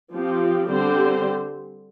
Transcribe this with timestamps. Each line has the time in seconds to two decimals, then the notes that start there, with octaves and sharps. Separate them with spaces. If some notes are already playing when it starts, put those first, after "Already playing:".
0.13 F3 C4 G4
0.69 D3 G3 C4 G4 C5